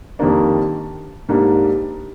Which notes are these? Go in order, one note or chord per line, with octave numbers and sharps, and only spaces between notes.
F2 D#3 G3 A#3 D4
G#2 G3 A#3 D4